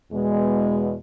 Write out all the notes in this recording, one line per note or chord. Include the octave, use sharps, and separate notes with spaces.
E2 B2 G#3